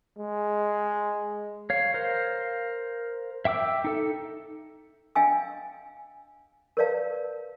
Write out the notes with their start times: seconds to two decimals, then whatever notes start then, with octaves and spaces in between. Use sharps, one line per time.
0.18 G#3
1.70 C#5 F5
1.94 A#4 C5 F5
3.45 E5 G5 D6 E6
3.84 D#4 A4
5.15 D4 D#5 F5 G5 G#5 E6
6.77 A#4 B4 C#5 D5 F5 A5